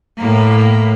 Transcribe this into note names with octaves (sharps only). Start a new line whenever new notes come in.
A2 A#3